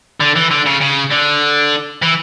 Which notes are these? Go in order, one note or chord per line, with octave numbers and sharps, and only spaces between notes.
D3
E3
D3
C#3
C#3
D3
E3